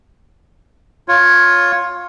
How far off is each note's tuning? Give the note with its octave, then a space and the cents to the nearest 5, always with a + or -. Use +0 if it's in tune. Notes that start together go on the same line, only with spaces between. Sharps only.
F4 +15 C#5 +0